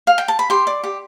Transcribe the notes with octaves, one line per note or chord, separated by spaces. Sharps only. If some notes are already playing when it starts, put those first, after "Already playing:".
F5
G5
A5
B5
G4 C6
D5
G4